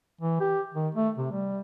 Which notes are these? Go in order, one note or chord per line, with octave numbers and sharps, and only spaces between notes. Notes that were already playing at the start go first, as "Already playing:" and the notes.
E3
G4
D#3
A3
C3
G3